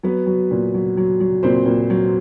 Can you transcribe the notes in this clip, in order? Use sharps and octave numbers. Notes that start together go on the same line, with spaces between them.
F#3 B3 B4
F#3
A#2
F#3
F#3
F#3
A#2 C4 C5
A#2
F#3